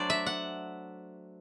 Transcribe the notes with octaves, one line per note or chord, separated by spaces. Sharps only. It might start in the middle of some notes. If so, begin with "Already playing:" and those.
Already playing: F#3 A3 D4 C5 D5
E5
F#5